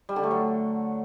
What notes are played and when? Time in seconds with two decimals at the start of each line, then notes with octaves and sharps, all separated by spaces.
0.09 G3
0.16 D3
0.23 A3
0.31 F#3